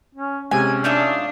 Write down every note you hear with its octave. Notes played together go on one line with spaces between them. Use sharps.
C#4
C3 G#3 C#4 G#5
D4 D#4 F4 E5